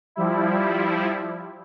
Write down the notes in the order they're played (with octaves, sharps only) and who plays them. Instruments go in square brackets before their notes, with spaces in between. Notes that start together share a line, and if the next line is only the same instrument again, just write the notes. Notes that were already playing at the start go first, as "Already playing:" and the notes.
[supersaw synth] F3 G3 E4